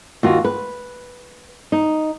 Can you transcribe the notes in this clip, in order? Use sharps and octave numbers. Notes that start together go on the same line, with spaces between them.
D#2 F4 F#4
B4
D#4